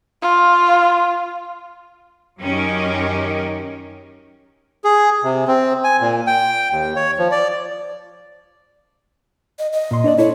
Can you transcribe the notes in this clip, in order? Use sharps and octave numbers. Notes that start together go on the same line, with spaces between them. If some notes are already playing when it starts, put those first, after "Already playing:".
F4
F#2 D#3 C#4 D#4 G4 A#4
G#4
C3
C4
G#5
A#2
G5
D#2
C#5
F3
D5
D#5
D#5
A#2 C6
D4 C#5 D5
E4 A4 C#5